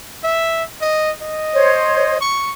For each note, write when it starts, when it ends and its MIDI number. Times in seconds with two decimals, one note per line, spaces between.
0.24 0.63 76
0.81 1.11 75
1.22 2.18 75
1.54 2.16 72
1.54 2.16 73
2.21 2.52 85